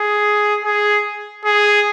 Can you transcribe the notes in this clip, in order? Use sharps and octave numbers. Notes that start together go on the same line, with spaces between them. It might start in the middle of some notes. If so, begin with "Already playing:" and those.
Already playing: G#4
G#4
G#4